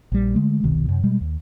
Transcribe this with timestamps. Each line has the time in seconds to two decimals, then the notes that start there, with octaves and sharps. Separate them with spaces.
0.12 A#1 G3
0.35 D3 G#3 A3
0.64 E1 C2 B2 D#3
0.89 F#2 C3
1.03 B2 G3 G#3
1.21 D#2